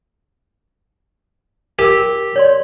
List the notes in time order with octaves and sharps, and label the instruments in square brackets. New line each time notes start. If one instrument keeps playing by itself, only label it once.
[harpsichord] G4 [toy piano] A#4 E6
[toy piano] C#5 D5 C6